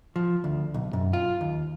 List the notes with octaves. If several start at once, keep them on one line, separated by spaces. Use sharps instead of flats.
F3
D2
B1
F#2
F4
D#2